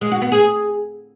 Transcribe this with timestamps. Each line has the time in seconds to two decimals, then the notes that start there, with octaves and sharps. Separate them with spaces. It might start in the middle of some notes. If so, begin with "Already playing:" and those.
0.01 G#3
0.11 F#4
0.22 B3
0.32 G#4